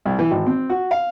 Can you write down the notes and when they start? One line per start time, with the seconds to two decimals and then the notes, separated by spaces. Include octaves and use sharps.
0.05 C2
0.19 E3
0.31 G#1
0.47 C4
0.70 F#4
0.91 F5